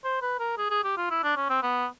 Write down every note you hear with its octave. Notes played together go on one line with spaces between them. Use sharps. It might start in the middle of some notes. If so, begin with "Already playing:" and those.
C5
B4
A#4
G#4
G#4
G4
F4
E4
D4
C#4
C4
B3